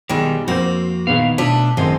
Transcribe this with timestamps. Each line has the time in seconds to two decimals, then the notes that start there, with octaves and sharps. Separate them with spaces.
0.09 B1 G#2 D#3 G3 G#3
0.48 F2 A#3 C4 F#4 C5
1.07 E2 A#2 D#3 B3 F5
1.38 B2 A3 D4 F4 B4
1.77 A1 F#2 D#3 G#3 C4 C5